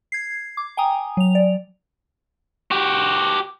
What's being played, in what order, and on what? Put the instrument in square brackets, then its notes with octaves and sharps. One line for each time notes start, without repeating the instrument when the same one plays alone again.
[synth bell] G#6 C7
D6
G5 G#5 A#5 D#6
F#3 F7
D5
[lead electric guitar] F#4 G4